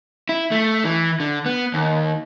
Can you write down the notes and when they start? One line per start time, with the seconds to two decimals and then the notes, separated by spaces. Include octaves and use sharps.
0.29 E4
0.51 A3
0.85 E3
1.20 D3
1.46 B3
1.74 D#2